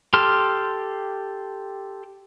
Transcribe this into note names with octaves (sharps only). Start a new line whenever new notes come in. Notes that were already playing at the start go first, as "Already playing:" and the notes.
G4 A4 C6 F6